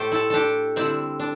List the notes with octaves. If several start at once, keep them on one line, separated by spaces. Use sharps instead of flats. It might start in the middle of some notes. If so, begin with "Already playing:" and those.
Already playing: A2 A3 G4 C5
E4 A4
D4 G4 A4
D3 G3 C4 E4
D4